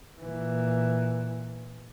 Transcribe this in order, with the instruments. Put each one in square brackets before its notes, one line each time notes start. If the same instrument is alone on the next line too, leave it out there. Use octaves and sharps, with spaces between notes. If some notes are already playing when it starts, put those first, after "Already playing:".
[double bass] A#2 E3